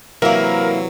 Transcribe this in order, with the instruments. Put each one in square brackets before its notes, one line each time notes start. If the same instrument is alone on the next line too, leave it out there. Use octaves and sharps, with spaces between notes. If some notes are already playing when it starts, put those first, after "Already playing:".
[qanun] C3 E3 [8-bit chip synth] F#3 [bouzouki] A#3 E4 [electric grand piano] A#4